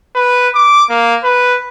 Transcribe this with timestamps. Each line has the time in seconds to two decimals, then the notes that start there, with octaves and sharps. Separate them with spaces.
0.15 B4
0.55 D6
0.89 A#3
1.24 B4